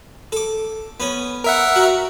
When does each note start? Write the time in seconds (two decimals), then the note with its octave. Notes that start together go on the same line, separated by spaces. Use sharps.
0.32 A4 D6
1.00 B3 C#4
1.44 A#4 E5 F#5
1.76 F#4 A#5